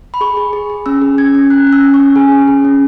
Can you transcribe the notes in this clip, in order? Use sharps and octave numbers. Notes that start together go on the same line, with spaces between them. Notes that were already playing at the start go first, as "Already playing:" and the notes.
B5
G#4 C#6
G#4
G#4
G#4
C#4 E6
G#4
C#4 G#6
C#4
C#4 F#6
C#4
E6
C#4
C#6
C#4
G#4 G#5
C#4
G#4
C#4